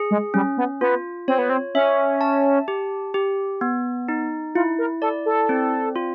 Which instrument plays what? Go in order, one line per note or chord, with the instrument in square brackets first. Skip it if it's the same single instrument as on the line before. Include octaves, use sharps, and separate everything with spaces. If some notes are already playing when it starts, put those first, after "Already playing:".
Already playing: [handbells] G#4
[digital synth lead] G#3
[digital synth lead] G3 [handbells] C#4
[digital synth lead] B3
[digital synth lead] B3 [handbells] F4
[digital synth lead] C4 [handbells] C#5
[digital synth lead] B3
C4
[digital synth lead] C#4 [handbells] E5
[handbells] A5
G4
G4
B3
D#4
[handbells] E4 [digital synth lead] F4
[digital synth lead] A#4
[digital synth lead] A4 [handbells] D5
[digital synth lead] A4
[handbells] C4
F4